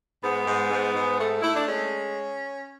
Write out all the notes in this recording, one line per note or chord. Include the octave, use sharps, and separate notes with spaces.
G#2 B3
G#2
G#2
G#2
A3
A3 E4
D4
G#3 C#4